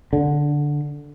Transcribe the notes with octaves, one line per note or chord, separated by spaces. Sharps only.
D3